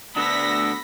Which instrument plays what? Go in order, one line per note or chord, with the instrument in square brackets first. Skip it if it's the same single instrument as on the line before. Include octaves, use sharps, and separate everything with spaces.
[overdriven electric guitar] D2 D4 [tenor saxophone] B3 [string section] B5 A#6 B6 [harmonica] E6